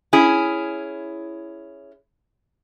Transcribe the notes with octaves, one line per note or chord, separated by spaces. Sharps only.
C#4 E4 G#4